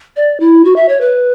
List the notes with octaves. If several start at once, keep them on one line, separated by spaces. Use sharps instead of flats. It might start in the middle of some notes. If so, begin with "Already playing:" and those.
D5
E4
F#4
E5
C#5
B4